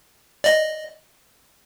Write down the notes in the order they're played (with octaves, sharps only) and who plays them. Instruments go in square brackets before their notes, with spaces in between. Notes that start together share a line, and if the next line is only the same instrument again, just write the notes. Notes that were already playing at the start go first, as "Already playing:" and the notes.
[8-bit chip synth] D5 D#5